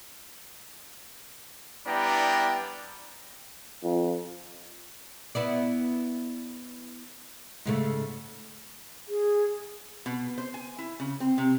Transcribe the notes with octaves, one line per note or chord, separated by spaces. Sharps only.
G3 B3 D4 E4 G5 A#5
F2
B3 E4 D5
G#2 C#3 A3
G#4
B2
C5
G#5
E4
C#3
C4
C3